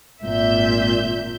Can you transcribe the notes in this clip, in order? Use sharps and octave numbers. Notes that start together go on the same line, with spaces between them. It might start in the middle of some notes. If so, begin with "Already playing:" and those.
G#1 A#2 E5 G6